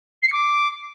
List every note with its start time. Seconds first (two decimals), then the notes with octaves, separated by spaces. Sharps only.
0.22 C7
0.27 C#7
0.32 D6